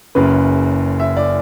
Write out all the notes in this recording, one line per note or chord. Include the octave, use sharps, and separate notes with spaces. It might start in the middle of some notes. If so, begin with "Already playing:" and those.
F#1 F#2 C#3 B4
E5
D5